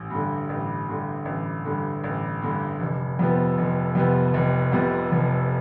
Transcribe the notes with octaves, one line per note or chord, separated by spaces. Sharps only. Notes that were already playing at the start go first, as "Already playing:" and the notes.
Already playing: A1
G2 D3
A1
G2 D3
A1
G2 D3
A1
G2 D3
F1
F2 C3 F3 B3
F1
F2 C3 F3 B3
F1
F2 C3 F3 B3
F1